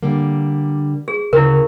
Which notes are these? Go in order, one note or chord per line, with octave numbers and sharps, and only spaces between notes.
D3 G3 A#3
G#4
D2 C#3 C#4 E4 A#4